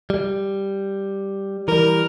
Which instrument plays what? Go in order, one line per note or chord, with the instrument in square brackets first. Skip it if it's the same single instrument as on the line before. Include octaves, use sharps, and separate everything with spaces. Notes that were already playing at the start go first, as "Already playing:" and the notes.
[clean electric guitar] G3
[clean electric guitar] E3 G3 [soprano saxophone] A#4